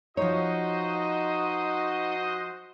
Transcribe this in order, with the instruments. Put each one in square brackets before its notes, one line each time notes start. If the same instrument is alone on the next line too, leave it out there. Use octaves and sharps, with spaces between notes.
[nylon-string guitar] F3 C#5 [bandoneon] D#4 [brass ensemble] F#4 C5 D#5